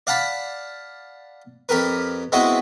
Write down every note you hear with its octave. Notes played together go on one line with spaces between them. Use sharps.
D5 F5 F#5 A5 B5
F2 G4 A#4 B4
G#3 B3 C4 E4 F#4 D#5